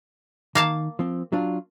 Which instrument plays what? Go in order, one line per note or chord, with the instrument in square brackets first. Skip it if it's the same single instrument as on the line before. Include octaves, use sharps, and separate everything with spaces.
[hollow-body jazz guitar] D#3 [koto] A#3 F5 A5
[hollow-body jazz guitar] F3 C4
F#3 D4 F4